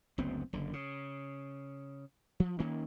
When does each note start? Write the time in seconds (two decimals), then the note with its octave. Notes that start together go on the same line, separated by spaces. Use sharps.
0.18 F#1 D2 B3 C4
0.53 F#1 D3
0.73 C#3
2.40 F3
2.59 D#3 A#3 C#4